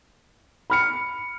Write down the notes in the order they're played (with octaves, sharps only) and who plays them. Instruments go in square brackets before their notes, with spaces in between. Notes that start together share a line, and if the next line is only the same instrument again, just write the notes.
[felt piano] B5 F6 C#7